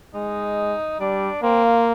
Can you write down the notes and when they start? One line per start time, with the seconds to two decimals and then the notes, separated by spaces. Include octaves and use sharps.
0.14 G#3 D#4
1.00 G3 D4
1.43 A#3 C4
1.64 F4